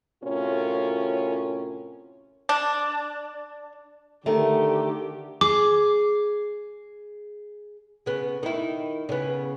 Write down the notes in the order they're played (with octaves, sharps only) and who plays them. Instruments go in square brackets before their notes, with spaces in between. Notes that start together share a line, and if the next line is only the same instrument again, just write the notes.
[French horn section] A2 C3 C#4 F4 F#4 A#4
[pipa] D4
[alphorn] D3 [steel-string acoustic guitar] D#3 A3 [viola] G4
[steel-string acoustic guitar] G#4 [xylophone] D6
[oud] C#3 B3
D#3 E4
C#3 B3